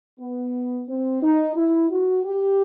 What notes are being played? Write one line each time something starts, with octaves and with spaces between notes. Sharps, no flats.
B3
C4
D#4
E4
F#4
G4